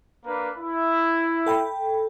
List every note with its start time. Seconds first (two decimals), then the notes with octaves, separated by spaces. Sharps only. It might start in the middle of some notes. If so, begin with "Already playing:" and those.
0.25 A#3 D4 B4
0.59 E4
1.46 A4 G5 B5